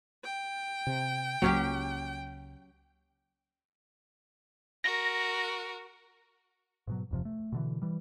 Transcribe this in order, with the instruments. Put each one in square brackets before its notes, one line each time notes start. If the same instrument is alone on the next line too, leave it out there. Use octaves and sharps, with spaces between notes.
[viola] G5
[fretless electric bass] C3
[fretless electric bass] C#2 A#3 [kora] F#3 C#4 G4
[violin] F#4 A#4 [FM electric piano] A#6
[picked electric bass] G#2 B2 F#3
D1 F2 C3 F3
A3
B2 D3 E3
E3 G3